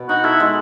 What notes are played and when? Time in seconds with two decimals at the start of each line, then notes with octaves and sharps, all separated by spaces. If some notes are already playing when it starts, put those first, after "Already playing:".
Already playing: B2
0.09 D#4 F#4
0.24 E4 A4
0.40 G#3